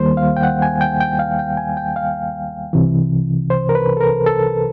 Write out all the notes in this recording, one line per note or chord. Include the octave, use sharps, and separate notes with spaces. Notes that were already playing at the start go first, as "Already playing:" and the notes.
Already playing: D#2 D#3 G3 A#3 C5
F5
G5
F#5
G#5
G5
G5
F5
G5
G#5
G5
F5
C2 C3 E3
C5
A#4
B4
A4
A#4
A4